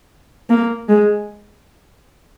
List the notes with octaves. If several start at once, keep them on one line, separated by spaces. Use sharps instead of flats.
A#3
G#3